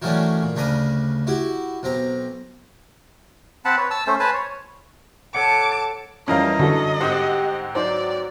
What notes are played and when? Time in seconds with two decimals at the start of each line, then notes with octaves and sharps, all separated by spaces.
0.02 D#3 E3 F#3 A3 C#4 D4
0.43 A#2
0.56 D2 C#3 D4 A#5 B5 D#6
1.27 E4 F#4 G4
1.83 B1 C4 A#5
3.65 C4 F#5 A5 B5
3.78 B4 C#5
3.91 A5 E6
4.07 A3 C#4 C5
4.20 B4 C5 G#5 A5
4.34 C#5
5.35 A4 C#5 F#5 A5 D6
6.28 F2 E3 G3 C#4 A#4 D#5 F5
6.59 F#2 D3 F#4 A4
7.00 G#2 C4 G4 C5 F#5
7.75 F#3 D#4 C5 D5